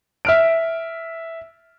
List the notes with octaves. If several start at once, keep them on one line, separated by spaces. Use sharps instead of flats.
E5 F6 D7